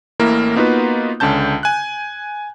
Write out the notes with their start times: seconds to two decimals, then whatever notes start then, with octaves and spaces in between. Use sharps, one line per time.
0.19 A1 A2 A#3 E4 A#4
0.56 A#3 B3 D#4 F4 F#4 B4
1.20 C#2 D3 C#4 A5 G6
1.63 G#5 F#6